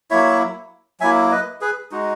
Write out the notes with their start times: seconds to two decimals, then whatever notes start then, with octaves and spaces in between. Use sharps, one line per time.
0.10 F#3 A#3 E4 C#5 E5
1.00 F#3 A#3 E4 E5 G#5
1.31 B4 D#5
1.61 G#4 B4
1.91 G#3 D#4 F#4